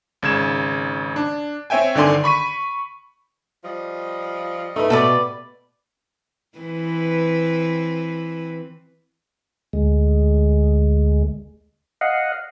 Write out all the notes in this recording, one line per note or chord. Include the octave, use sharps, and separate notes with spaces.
G#1 C#3 G#6 E7
D4
C4 C#5 E5 G5 G#5
G1 D3 D#3 D5 G#5 C6
B5 C#6 B6 D#7
F3 G3 D#5
A3 D#4 B4
B2 G4 A4 B4 D5
E3 C4 B4
D2 G#3
D#5 F5 F#5